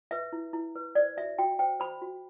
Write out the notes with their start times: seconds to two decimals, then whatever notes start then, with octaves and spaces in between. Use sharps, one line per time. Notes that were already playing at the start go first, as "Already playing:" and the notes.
0.11 B4 E5
0.33 E4
0.53 E4
0.75 B4
0.95 C5 D5
1.17 F#4 E5
1.38 F#4 G5
1.59 C5 G5
1.80 C5 B5
2.02 F#4